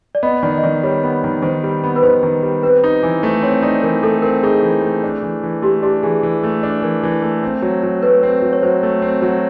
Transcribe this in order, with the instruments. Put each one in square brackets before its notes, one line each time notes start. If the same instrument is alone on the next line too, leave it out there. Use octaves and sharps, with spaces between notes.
[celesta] D5
[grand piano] B3 [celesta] D#5
[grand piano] D#3 [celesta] D5
[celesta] D#5
[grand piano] D#3 [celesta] D5
[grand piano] G3 [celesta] C#5
[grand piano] B3
D#3
[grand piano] D#3 [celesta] C5
[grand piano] G3
B3
[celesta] B4
[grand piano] D#3 [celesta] C5
[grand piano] D#3
G3
[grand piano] C4 [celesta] B4
[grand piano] D#4
E3
[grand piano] A3 [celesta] C5
[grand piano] C4 [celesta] C#5
[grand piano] D#4 [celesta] D5
[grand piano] E3 [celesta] A#4
[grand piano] A3 [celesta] A4
[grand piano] C4 [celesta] A#4
[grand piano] D#4 [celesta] G#4
[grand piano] E3
A3
D4
E3
E3
[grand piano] A3 [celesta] G4
[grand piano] D4 [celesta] G4
[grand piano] E3 [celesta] G#4
[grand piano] E3
A3
D4
[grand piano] E3 [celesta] A#4
[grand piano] E3
A3
C4
F#3
F#3
[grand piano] A3 [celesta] B4
[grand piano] C4
F#3
[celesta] C#5
[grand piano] F#3 [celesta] C5
[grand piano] A3
C4
F#3